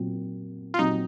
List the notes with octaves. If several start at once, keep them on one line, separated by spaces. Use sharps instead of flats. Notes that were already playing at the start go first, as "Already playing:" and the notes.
Already playing: A#2 F#3 C4
F4
A#2 F#3 C4 D#4